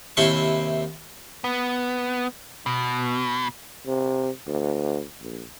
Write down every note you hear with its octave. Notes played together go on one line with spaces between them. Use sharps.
D#2 C3 E4 C6 C#6
B3
B2
C3
D2
A#1